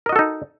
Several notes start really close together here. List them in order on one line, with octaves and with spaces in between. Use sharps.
A#4 D#5 F#4 A4 D#4